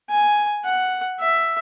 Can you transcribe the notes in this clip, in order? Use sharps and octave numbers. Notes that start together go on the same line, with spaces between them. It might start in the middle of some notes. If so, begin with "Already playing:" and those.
G#5
F#5
E5